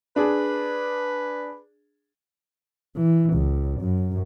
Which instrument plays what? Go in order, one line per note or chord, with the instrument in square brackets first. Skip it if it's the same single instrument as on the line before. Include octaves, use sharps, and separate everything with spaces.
[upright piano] D4 G#4 [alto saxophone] B4
[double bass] E3
C#2
F#2